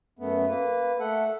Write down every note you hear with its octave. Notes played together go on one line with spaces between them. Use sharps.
F#2 A3 B3
A#3 B4
A3 A4 F#5